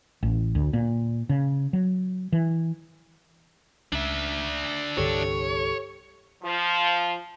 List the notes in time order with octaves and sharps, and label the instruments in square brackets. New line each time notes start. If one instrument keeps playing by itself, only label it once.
[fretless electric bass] A1
D2
A#2
C#3
F#3
E3
[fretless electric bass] C#2 [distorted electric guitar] D4 E5
[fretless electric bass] C2 G2 D3 [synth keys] G4 A4 [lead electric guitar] C#5
[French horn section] F3